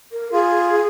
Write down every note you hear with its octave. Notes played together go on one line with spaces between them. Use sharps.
A#4
F4 G#4